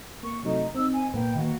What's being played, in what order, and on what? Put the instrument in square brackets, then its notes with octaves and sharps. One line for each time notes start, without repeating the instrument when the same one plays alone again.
[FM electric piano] A#3 [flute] C#6
[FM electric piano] C3 F#3 A3 [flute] D#4
[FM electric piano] C4 D#4 [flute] E6
[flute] G#5
[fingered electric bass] A#2 A#3 [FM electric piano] B4 [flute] G5
[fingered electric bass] D#3 A#3 [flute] F#4